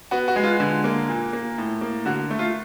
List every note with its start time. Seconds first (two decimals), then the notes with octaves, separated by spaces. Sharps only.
0.11 B3 F#4
0.28 F#4
0.36 G#3
0.44 F4
0.60 D3
0.84 A#3
1.09 A#2
1.33 A#3
1.58 A2
1.81 A#3
2.06 D3 F#4
2.30 A3
2.39 F4